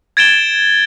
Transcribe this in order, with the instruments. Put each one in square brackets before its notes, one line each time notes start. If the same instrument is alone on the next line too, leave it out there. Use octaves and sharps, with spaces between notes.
[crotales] G#6 A6 D7 E7 G7